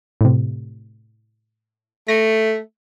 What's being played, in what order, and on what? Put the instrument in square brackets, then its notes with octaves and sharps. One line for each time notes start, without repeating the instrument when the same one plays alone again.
[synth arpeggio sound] A2 C3
[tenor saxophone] A3 [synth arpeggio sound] A#6